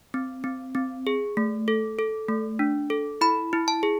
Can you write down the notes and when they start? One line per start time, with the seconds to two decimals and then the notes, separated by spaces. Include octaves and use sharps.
0.14 C4
0.44 C4
0.75 C4
1.07 G#4
1.37 A3
1.68 A4
1.99 A4
2.29 A3
2.59 D4
2.90 A4
3.21 E4 B5
3.53 E4
3.68 A5
3.83 G#4